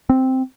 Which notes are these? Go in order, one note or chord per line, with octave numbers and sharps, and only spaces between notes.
C4